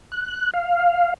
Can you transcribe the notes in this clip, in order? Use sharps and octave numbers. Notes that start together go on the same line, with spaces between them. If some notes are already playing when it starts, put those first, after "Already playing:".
F#6
F5